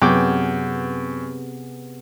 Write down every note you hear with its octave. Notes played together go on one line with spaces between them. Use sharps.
F#2 C3 B3 G#4 G5 D6